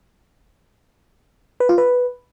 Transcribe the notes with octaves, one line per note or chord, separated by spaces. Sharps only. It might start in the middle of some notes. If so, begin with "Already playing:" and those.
B4
F4
B4